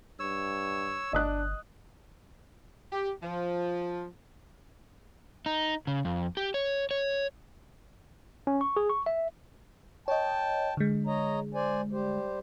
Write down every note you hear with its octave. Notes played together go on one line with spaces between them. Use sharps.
G2 C#5 E6
G1 D4 D#5 D#6 F#6
G4
F3
D#4
C#3
F2
G4
C#5
C#5
C#4
C#6
G#4
C#6
E5
C#5 D#5 G5 A5
D3 G#3
C#5 D#5 A#5
C5 D5 G#5
G3 G4 C5